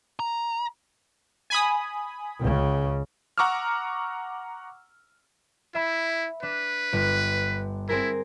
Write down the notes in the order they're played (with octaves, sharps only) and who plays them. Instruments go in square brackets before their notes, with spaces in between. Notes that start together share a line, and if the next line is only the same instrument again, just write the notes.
[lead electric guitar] A#5
[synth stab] G#5 B5 D#6
[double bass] C#2 C#3
[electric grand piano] F#5 A#5 C#6 D6 E6 F6
[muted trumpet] E4 [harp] E5 B5
[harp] D4 [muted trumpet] B4
[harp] G1 F#6 B6
[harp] C4 G#4 A#4 [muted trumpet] E4